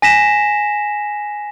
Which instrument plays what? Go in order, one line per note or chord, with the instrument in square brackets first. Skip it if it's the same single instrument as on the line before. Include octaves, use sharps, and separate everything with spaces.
[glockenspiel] G#5 A#6 B6 E7